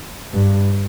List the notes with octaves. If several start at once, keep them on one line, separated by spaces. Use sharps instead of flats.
G2